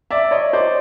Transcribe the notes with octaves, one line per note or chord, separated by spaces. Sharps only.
D5 E5
C#5 D#5
C5 D5